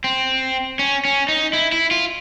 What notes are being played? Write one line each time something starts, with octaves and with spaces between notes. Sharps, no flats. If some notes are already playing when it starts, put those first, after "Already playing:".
C4
C#4
C#4
D#4
E4
E4
F4